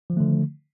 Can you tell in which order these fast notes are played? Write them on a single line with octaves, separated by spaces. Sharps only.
F3 D#3 A3 D3